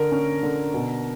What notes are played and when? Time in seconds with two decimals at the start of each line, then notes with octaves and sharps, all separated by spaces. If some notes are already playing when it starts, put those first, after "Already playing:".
Already playing: D3 A#4
0.12 C#4
0.43 D3
0.74 B2